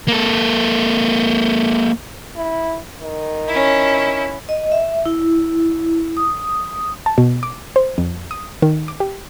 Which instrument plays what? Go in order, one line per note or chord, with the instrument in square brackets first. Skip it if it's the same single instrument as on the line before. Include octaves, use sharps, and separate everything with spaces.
[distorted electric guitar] A#3 A4
[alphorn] E4
D#3
[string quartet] C#4 E4
[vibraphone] D#5
E5
E4
D#6
[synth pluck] A5
B2
D6
C5
F2
D#6
D#3
D6
G4